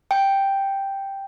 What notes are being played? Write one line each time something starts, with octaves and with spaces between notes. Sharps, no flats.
G5